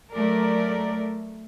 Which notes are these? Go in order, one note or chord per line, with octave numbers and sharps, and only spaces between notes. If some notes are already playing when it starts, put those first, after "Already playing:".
F#3 A3 A#4 D5